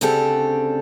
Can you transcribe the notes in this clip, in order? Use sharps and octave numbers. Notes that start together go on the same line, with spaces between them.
D2 C#3 C4 D4 G4 A4